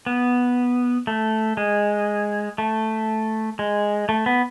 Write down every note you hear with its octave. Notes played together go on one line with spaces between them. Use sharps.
B3
A3
G#3
A3
G#3
A3
B3